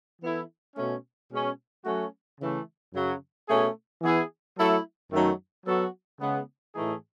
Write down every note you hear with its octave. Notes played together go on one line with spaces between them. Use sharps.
E3 B3 E4 A4
B2 A3 C#4
B2 G#3 C#4
F#3 A3 C#4 F#4
C#3 E3 A3
F#2 C#3 F#3
B2 A3 C#4 G#4
E3 B3 E4 G#4
F#3 A3 E4 A4
F#2 D#3 F#3 A3 D#4
F#3 B3 F#4 A4
C#3 G#3 B3
A2 E3 A3 D#4 G#4